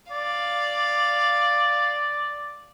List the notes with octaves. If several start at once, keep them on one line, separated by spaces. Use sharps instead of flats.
D5 F5